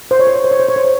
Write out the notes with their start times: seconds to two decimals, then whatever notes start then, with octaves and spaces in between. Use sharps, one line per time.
0.11 C5
0.19 C#5
0.27 C5
0.36 C#5
0.44 C5
0.51 C#5
0.60 C5
0.69 C#5
0.76 C5
0.85 C#5